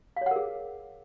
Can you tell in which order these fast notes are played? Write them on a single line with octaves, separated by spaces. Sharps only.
F5 C#5 F#5 A#4 G#4